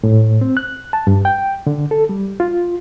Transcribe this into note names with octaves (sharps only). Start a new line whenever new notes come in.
A2
C4
F#6
A5
G2
G5
D3
A4
G3
F4